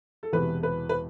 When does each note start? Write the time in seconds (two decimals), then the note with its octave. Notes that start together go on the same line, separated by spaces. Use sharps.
0.23 A4
0.33 E1 E2 C3 E3 B4
0.63 B4
0.89 B4